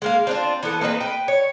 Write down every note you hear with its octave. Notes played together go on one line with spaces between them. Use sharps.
G#3 A#3 F5
C4 D4 F4
E3 B3 A4
A#3 C4 D#4 B4
B4 G5
C#5